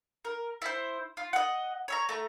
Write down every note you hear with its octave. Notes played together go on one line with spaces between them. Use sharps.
A#4
E4 C5
F4
D#5 F#5
C#5 E5 A#5
A3 A#5